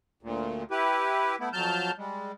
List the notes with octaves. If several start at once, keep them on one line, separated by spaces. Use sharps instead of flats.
D2 A#2
E4 G4 B4
A3 B3 E4
F2 F#3 A5 F6 G6
G3 G#3